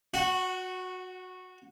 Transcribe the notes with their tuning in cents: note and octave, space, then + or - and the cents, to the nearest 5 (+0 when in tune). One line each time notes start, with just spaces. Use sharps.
F#4 -15 F#5 +15